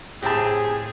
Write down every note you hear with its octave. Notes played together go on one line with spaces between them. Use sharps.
A2 C4 G4 G#4 A5